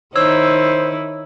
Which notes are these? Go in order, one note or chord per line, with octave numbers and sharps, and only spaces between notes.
D#3 D#4 E4 C5 C#5 E6